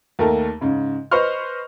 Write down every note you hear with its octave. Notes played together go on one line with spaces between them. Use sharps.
D#2 A3 A#3 A#4 A5
G#2 C#3
B4 C5 D#5 C6 C#6 F6